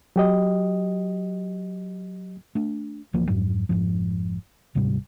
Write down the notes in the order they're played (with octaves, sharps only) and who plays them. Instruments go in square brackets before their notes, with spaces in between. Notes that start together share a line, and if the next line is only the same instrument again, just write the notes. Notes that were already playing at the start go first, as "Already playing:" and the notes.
[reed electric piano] F#3 G4 D#5
[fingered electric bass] A3 D4
D1 E3 F3 A#3
F2 G#2 F#3
F1 A#1 G#2 F3
D1 G#2 C3 G3